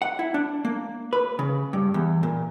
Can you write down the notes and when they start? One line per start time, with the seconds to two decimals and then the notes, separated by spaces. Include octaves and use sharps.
0.02 F#5
0.19 E4
0.34 D4
0.65 A#3
1.13 B4
1.39 C#3
1.73 G2
1.94 E2
2.23 A#2